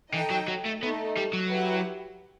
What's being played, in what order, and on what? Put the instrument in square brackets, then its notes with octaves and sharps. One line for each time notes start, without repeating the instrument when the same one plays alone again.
[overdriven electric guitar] E3 [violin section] D#4 A4 D#5 G5
[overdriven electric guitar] F#3
F#3
A3
[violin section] A3 D#4 A4 [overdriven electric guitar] B3
[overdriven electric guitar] G3
F#3
[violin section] E4 G4 B4 F#5